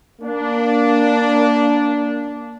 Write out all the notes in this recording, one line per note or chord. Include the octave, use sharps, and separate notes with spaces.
A#3 D4